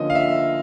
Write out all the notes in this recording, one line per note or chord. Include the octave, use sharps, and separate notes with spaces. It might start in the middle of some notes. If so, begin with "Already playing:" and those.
Already playing: D3 F3 A#3 C#4 D#5
F5
E5